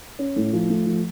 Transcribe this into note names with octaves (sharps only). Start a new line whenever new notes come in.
C#4
A2
F3
A3
F3